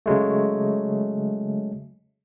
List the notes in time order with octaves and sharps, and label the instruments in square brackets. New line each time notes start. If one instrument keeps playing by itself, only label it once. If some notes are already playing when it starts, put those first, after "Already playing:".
[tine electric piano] C#3 F#3 G#3 A3